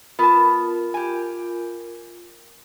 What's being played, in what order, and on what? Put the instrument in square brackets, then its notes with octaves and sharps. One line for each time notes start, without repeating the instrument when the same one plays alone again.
[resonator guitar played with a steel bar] B3 A5 [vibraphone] F4 A#4
[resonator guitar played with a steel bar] G4 G#5